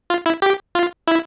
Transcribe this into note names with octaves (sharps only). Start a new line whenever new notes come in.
F4
E4
G4
F4
E4